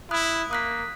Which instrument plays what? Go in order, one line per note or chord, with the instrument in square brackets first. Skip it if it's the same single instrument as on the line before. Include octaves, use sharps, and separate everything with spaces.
[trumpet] E4 [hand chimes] B5 D#6 F#6
[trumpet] A#3 [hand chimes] D#6 F#6 B6